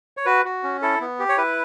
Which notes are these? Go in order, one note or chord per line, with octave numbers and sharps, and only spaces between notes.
C#5
F#4 B4
F#4
C#4
E4 A4
B3
G4
C#5
E4 B4